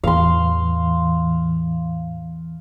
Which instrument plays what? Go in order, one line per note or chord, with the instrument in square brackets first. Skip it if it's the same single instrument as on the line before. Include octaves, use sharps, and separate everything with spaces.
[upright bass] E2 [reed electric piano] A2 E3 [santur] F5 C6